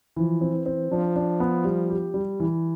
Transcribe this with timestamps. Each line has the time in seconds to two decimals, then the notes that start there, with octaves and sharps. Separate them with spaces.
0.16 E3 F3
0.41 C4
0.54 E3
0.66 C4
0.91 F3 D4
1.16 D4
1.40 B3
1.64 G3
1.90 G4
2.14 G3
2.40 E3